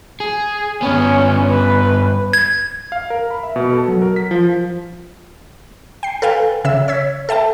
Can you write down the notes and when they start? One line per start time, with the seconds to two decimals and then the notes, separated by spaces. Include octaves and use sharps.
0.20 G#4
0.82 G2 B3 C#4
1.51 B4
2.33 G#6
2.92 F5
3.10 A#4
3.31 B5
3.43 E5
3.56 B2
3.72 A4
3.88 F#3
4.02 A#4
4.16 B6
4.31 F3
6.03 G5 C7
6.22 A4 B4 F5 G5 G#5
6.65 C#3 E5 E6
6.88 C#5 E6 G#6 B6
7.29 A4 E5 G5 A5